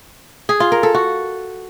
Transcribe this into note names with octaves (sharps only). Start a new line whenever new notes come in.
G#4
F4
A#4
A4
F#4